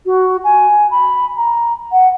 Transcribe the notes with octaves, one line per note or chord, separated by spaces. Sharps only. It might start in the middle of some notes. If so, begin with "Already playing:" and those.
F#4
G#5
B5
A#5
F#5